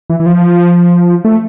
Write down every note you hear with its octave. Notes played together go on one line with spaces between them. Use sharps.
E3
E3
F3
A3